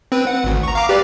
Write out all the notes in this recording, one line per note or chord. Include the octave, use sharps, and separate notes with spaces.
C4 B4
F#5
G#1 D2
A#5 C#6
F5 A#5 D6
G4 B4 D5